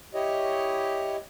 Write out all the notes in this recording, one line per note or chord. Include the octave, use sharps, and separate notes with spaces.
E4 G4 C#5 D#5